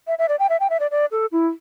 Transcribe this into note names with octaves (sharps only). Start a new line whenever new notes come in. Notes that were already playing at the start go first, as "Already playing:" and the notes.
E5
E5
D5
G5
E5
G5
E5
D5
D5
A4
E4